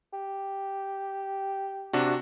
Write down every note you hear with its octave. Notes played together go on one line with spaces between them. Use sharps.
G4
C3 D4 F#4